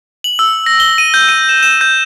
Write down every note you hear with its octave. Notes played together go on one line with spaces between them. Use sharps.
F#7
E6
A#6
G7
D#7
G6
D#7
E7
E7
G6